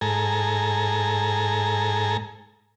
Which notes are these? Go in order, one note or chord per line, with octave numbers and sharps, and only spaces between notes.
G#2 A4 G#5 A#5